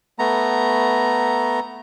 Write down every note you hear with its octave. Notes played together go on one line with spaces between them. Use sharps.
A3 B3 A#5